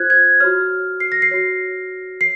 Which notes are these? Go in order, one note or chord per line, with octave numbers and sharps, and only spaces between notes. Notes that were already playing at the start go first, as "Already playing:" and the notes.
Already playing: F4 C5 F#6 G#6
G#6
F#4 C#5 F6
C7
A#6
C7
F#4 C#5
C7